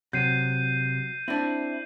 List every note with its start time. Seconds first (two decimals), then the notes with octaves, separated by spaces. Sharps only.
0.13 C3 F#3 G6 C7 D#7
1.28 C4 D4 E4